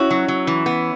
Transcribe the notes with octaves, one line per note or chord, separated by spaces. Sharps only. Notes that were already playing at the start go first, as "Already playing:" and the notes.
Already playing: C#4 E4 F#4
F#3
F#3
E3
B3